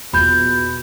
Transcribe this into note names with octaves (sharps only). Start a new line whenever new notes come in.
E2 B2 F4 B5 G6